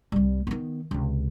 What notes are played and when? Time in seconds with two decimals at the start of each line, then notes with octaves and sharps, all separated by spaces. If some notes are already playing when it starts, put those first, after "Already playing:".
0.12 C2 G3
0.47 D#3 B3
0.91 C#2 C3